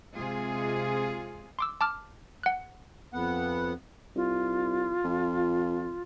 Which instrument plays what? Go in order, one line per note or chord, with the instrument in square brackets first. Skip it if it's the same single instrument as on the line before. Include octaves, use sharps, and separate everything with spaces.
[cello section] C3 G#3 F4 G#4
[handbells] C6 D6 E6
A5 D6 F6
F#5 F#6
[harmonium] F2 B3 F#5
[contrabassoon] C2 [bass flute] F4
[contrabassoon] F2